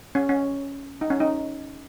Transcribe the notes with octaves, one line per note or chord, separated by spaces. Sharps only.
C#4
C#4
D#4
C#4
D#4